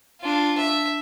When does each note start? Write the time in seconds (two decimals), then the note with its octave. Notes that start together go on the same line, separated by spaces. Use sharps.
0.21 D4 F4
0.58 E5